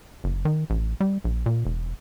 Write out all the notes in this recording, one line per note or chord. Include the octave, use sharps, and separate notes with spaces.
F#1
D#3
A1
G3
A#1
A#2
E1